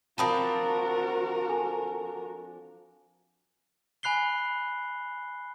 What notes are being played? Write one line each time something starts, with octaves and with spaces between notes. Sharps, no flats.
F3 C4 D4 F#4 A#4 A5 B5 D#6
A4 G#5
G#5 B5 F#6 C7 G7